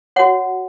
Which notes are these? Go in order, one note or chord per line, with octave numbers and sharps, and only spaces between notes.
F#4 C#5 F#5